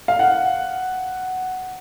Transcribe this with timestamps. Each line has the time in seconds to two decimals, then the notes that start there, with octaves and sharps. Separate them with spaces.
0.08 F5
0.19 F#5